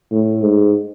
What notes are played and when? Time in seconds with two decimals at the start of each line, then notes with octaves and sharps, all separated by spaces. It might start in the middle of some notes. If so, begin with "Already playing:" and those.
0.12 A2
0.43 G#2